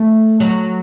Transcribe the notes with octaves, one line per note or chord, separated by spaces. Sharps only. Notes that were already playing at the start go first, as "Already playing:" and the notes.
Already playing: A3
F#3